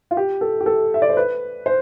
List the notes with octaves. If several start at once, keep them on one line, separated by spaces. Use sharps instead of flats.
F4
G4
A4
G4
A4
E5
D5
C5
B4
C5